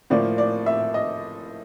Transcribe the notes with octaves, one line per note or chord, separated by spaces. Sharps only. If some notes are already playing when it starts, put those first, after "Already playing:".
A2 F3 A#3 D5
D5
E5
D#5